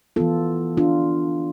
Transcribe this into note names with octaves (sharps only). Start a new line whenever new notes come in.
E3 B3 F4 A4
D4 F4